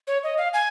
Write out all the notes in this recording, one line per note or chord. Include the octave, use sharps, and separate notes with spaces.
C#5
D#5
F5
G#5